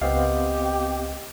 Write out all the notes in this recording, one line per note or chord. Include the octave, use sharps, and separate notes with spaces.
C#2 B3 C4 G4 D#5 F5